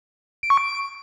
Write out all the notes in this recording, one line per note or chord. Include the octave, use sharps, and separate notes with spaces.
D7
C#6
D7